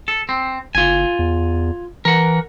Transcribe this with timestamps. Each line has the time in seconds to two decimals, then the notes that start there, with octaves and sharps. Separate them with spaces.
0.08 A4
0.29 C4
0.75 F#1 F4 G#5
1.19 E2
2.05 E3 A#4 F#5